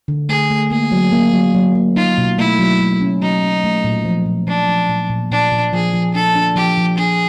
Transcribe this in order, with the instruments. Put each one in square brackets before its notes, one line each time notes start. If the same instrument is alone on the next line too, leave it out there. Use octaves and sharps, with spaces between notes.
[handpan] D3
[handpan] A3 [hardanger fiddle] G#4
[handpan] A3
[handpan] A#3 [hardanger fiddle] G#4
[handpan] F#3
A#3
F#3
F#3
A#3
[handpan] D#4 [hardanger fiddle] F4
[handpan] B2
[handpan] A3 [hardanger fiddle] E4
[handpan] F#3
F#3
C#4
[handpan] F#3 [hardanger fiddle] D#4
[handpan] C#4
A3
A#2
F3
A#2
[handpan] F3 [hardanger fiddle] D4
[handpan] F3
A#2
A#2
[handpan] A#2 [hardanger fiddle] D4
[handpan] A#2
[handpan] F3 [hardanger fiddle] G#4
[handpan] F3
[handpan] D4 [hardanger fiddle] A4
[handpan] D4
[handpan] F3 [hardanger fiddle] G4
[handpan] F3
[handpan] D4 [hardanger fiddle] G#4